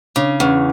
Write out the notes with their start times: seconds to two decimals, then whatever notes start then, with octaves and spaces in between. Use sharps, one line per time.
0.16 C#3 D4
0.40 E2 C#4